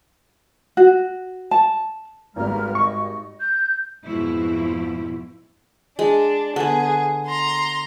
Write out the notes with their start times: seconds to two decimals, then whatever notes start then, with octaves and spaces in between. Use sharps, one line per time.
0.77 F#4
1.51 A5
2.36 G#1 G#2 G3 B4 A#5 F6
2.75 D#5 C#6
3.40 G6
4.05 F2 G#2 B2 F3 E4
5.99 G#3 D4
6.56 D3 B3 G#4
7.26 A#5 C6